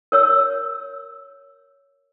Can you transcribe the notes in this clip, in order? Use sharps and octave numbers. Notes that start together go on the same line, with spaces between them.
A#4 C#5 E6